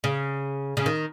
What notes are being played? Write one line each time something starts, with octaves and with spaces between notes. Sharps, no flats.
C#3
C#3
D#3